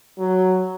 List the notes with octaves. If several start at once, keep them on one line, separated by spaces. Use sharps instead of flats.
F#3